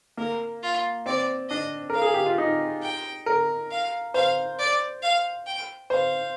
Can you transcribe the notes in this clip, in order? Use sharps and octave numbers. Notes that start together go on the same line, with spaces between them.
A#3 A#4
F4
C4 D5
D4 D#5
A#4 F5
G#4
G4
F4
D#4
G5
A#4
F5
C5 F5
D5
F5
G5
C5 F5